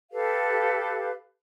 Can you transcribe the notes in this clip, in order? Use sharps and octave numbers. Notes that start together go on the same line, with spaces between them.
G4 A4 B4 F5